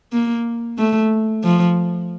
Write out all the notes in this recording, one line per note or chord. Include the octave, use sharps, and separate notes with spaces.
A#3
A3
F3